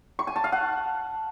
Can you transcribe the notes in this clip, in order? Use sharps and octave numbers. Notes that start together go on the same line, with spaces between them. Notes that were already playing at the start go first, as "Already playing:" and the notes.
C#6
G#5
A5
F5
F#5